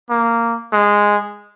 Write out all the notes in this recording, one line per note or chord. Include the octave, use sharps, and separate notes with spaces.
A#3
G#3